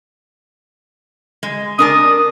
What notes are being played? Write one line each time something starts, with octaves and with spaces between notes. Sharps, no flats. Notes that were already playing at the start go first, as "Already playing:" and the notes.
G#3
D4 A#4 A5 D#6